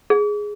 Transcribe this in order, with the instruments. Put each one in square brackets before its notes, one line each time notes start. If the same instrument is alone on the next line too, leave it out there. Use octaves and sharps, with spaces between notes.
[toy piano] G#4